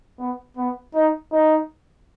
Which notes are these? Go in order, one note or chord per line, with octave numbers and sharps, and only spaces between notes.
B3
B3
D#4
D#4